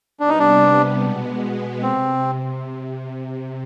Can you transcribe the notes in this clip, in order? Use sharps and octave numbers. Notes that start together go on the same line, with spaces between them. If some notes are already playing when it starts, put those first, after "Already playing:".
C3 G3 B3 D4
D#4
D4
B2 G#3 B3
C3 C4